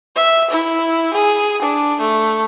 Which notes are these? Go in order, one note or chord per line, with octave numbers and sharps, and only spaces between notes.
E5
E4
G#4
D4
A3